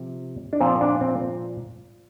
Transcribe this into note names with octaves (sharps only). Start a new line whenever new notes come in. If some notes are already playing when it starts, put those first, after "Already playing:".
Already playing: C3 F3
D4
A#2 F3 C4
D4
C4